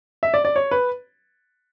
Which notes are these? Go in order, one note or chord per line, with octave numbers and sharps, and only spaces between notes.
E5
D5
D5
C#5
B4